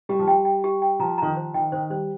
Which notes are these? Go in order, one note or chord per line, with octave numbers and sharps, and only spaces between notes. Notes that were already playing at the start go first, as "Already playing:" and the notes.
G3 G4
F3
G3 G5
G5
G4
G5
F3 A#5
D#3 A#5
F3
C5
D#3 G5
D#3 C5
G3 C5